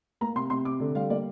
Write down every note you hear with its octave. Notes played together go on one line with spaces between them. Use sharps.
A#3 A#5
C3 C6
C3 C6
C3 D6
D3
G3 F5
A#3 D5